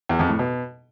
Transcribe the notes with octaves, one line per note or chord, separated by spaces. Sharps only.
E2
F2
A2
B2